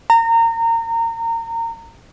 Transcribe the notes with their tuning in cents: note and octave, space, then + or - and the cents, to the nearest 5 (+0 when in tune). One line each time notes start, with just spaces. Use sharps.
A#5 -25